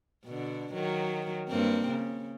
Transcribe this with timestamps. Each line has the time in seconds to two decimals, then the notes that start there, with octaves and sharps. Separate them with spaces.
0.25 B2 D3
0.73 D#3 F#3
1.49 G2 A#3 C4
1.88 C#3